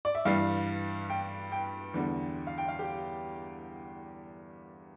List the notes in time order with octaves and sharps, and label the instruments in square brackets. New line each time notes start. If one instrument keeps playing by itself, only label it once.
[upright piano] D5
E5
G2 E3 G3 F5
G5
G5
E2 D3 G3
F5
G5
F5
G4